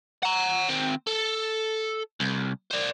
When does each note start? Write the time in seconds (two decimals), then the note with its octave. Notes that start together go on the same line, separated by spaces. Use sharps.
0.23 F#5 A#5
0.69 D#3 C4
1.07 A4
2.20 C2
2.71 C5 D5